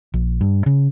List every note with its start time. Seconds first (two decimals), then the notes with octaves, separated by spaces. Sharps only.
0.14 A#1
0.41 G2
0.66 C#3